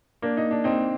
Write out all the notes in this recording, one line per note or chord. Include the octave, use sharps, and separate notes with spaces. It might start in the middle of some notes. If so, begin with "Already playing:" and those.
A#3 D4
D#4
D4
C4 D#4